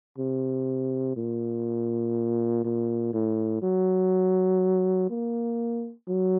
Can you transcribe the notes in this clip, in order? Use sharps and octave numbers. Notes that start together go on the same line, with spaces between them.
C3
A#2
A#2
A2
F#3
A#3
F#3